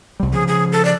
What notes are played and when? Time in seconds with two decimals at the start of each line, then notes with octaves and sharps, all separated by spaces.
0.20 C2 G3
0.33 C#3 F3 G#4
0.48 G#4
0.72 A4
0.85 D5